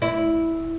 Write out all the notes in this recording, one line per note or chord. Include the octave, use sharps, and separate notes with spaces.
E4